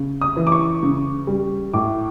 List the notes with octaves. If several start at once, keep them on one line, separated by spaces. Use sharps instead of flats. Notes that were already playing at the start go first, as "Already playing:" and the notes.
Already playing: C#3
D#6
E3
D6
C#6
C#3
G3
A2 D6